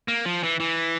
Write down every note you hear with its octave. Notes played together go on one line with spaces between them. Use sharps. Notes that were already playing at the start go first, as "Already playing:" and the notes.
A#3
F3
E3
E3